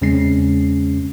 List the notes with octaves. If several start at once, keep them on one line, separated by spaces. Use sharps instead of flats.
E2 C#3 G#3 C4 C#4 C7